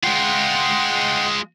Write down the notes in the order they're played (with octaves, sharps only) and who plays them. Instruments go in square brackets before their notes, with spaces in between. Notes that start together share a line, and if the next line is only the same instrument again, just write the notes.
[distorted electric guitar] G#3 F4 [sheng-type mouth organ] F#5 G5 C6